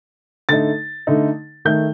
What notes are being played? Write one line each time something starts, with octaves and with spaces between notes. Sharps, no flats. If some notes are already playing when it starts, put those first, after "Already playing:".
D3 A3 D#4 A6
D3 A3 D#4
D#3 A3 D#4 G6